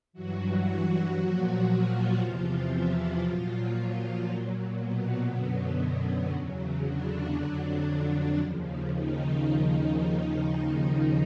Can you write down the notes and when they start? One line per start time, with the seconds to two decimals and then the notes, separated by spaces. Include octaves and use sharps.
0.13 G2 E3 F#3 F#4
0.64 F#3 F#4
1.15 A#2 F3
1.67 F3 F4
2.19 E2 C3 E3
2.70 E3 E4
3.22 A#2 F3 F#3 F4
4.26 A#2 F#3
4.77 B2 B3
5.28 F#2 D3 F#3
6.32 E2 C#3 F#3
6.83 D3 D4
7.35 F2 D3 F#3
8.38 D#2 C#3 F3
8.90 D#3 D#4